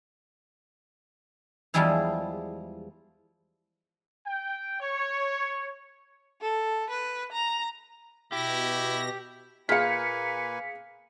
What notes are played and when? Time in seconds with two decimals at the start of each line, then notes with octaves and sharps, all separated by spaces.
1.74 E2 F3 G3 G#3 E4 F5
4.26 G5
4.80 C#5
6.41 A4
6.90 B4
7.32 A#5
8.32 B2 E4 G4 A#6
9.69 A#2 A#3 G#4 B4 F5 G#5 B6 C#7